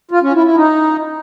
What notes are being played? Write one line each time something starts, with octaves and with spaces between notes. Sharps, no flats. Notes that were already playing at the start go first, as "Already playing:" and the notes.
F4
C#4
E4
E4
D#4